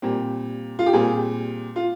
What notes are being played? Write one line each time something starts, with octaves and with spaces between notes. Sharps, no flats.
A#2 G3 C4
F4
G4
A#2 G3 C4 G#4
F4